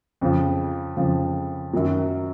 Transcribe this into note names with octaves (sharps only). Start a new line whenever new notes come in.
F2 C#3 F3
F2 C#3 F3
F#2 D#3 F#3